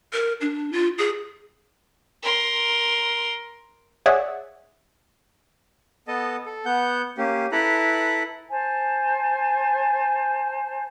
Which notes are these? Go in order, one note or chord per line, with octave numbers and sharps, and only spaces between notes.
A#4
D4
F4
G#4
A#4 C6
G#4 C#5 D5 E5 F#5
B3 A4 D#5 A5
A4
B3 F#5 G6
A#3 C#4 G4
E4 A4 B4 A#5 F#6
C5 G#5 A5